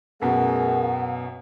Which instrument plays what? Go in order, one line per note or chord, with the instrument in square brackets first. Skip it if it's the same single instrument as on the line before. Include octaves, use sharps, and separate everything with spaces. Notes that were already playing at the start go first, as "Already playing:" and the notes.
[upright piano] F#2 B2 [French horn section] A3 G#4 A#4 [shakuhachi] F#5